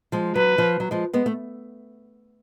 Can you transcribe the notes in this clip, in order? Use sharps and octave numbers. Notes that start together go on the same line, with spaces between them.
F3 G#3
F#3 B4
F3
F#3
F3 G#3
G#3 B3
A3